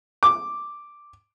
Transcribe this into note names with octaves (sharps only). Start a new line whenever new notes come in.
D6